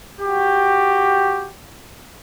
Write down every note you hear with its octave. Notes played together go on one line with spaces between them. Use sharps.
F#4 G4